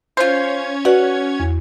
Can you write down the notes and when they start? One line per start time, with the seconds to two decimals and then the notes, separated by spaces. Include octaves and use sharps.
0.17 C#4 F4 C5 C#5 G#6
0.85 F#4 B4 D5 F#5
1.40 E2